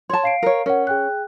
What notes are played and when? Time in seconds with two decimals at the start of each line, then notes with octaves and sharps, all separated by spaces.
0.10 C#5 A5 C6
0.23 F5 C7 D7
0.43 A#4 C#5
0.66 C#4 A#4 F#5
0.87 G#4 G5 F#6